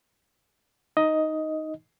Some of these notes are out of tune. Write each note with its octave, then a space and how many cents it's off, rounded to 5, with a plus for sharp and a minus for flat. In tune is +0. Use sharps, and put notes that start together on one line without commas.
D#4 +0 D#5 +10